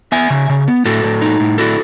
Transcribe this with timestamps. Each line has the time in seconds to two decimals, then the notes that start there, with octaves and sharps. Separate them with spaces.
0.12 B3 E5 G#5
0.30 C#3
0.50 C#3
0.68 B3
0.85 A2 F#4 A4
1.04 A2
1.22 D#4
1.40 A2
1.58 E4 F#4 A4